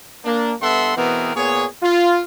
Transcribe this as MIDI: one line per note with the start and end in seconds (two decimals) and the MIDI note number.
0.24 0.53 58
0.24 0.53 62
0.61 0.96 43
0.61 0.96 59
0.61 0.96 69
0.61 0.96 76
0.61 0.96 78
0.61 0.96 84
0.97 1.32 47
0.97 1.32 52
0.97 1.32 59
0.97 1.32 60
0.97 1.32 68
0.97 1.32 70
1.35 1.65 46
1.35 1.65 59
1.35 1.65 68
1.35 1.65 73
1.82 2.21 65